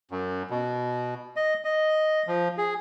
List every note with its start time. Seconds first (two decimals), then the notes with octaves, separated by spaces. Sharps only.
0.11 F#2
0.50 B2
1.36 D#5
1.65 D#5
2.27 F3
2.58 G#4